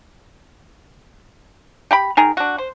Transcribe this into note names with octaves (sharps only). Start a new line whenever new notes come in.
G4 G5 B5
D#3 G#4 A#4
D4 F#4
C5